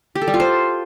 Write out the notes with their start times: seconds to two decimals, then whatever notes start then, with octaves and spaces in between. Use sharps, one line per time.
0.15 G4
0.22 A4
0.28 G3
0.34 F4
0.40 C5